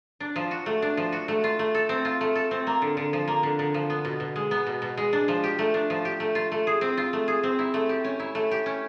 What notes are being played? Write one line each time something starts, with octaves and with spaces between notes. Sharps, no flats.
D4
F3
F#4
A3
D4
F3
F#4
A3
F4
A3
A4
C4
F4
A3
A4
C4
A#3
D3
D3
F3
A#3
D3
D3
F3
B3
B2
B2
G#3
B3
B2
B2
G#3
D4
F3
G4
A3
D4
F3
G4
A3
F4
A3
G#4
C4
F4
A3
G#4
C4
E4
A3
G4
C#4
E4
A3
G4
C#4